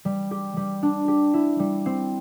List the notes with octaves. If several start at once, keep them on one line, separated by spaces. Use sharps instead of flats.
G3
G4
G3
D4
G4
E4
G3
C4